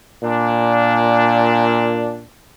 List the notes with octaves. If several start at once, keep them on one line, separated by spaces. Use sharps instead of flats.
A#2 D4